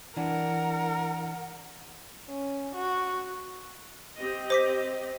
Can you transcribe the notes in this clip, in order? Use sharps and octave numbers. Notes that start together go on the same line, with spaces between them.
E3 D4 A#4 F#5
C#4
F#4
C4 G4 D#5
C5 D6 B6